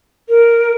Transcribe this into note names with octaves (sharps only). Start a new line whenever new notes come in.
A#4